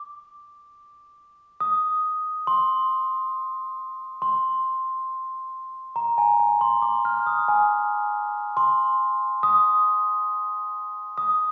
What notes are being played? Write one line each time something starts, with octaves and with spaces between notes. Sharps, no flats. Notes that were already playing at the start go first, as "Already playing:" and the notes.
Already playing: D6
D#6
C6
C6
A#5
G#5
G#5
C6
D6
F6
D#6
G#5
C6
D#6
D#6